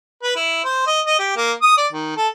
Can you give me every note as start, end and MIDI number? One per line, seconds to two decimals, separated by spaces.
0.23 0.34 71
0.36 0.62 64
0.65 0.84 72
0.87 1.01 75
1.06 1.18 75
1.19 1.33 67
1.36 1.52 58
1.62 1.77 87
1.78 1.87 74
1.92 2.16 51
2.17 2.28 69